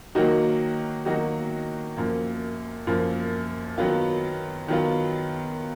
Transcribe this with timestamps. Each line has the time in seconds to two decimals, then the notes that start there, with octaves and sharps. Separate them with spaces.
0.15 D#3 F#3 A#3 D#4 F#4
1.05 D#3 F#3 A#3 D#4 F#4
1.97 F#2 F3 A#3
2.87 F#2 F3 A#3
3.78 D#3 F#3 B3 F4
4.68 D#3 F#3 B3 F4